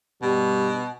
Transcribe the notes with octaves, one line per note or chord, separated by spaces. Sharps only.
G2 B2 G3